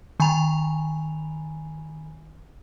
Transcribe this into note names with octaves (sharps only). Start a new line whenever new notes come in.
D#3 G#5 A#5 B5 F7